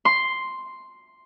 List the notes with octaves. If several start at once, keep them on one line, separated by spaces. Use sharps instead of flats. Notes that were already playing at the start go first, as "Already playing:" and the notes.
C6